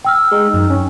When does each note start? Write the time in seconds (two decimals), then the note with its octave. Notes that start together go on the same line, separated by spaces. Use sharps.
0.05 G5 E6 F6
0.32 G#3 D#4
0.54 F#2
0.70 C#4